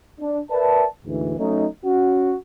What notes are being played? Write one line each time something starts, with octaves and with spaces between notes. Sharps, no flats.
D4
A#4 B4 D5 E5 A5
D2 G#2 E3
F#3 A3 C#4 D#4
C#4 F#4